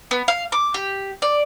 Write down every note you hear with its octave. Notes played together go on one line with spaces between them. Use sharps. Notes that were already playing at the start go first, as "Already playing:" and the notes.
B3
F5
D6
G4
D5